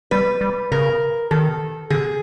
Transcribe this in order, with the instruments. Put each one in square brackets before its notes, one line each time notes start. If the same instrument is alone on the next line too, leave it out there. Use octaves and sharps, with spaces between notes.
[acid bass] G3 [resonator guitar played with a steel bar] B4
[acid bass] G3
[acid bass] C#3 [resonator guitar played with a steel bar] A#4
[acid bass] D#3 [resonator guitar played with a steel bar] A4
[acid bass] D3 [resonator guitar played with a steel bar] G#4